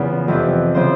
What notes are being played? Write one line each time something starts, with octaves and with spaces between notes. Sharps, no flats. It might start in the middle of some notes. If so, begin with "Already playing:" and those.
Already playing: E2 C#3 F3 B4
F2 C3 E3
C#3 F3 C5